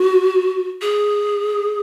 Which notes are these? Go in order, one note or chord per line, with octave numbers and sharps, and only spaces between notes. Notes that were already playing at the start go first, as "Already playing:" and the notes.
Already playing: F#4
G#4